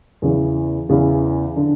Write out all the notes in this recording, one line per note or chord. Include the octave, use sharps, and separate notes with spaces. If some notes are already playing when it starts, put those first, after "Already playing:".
E2 C#3 E3
E2 C#3 E3
D3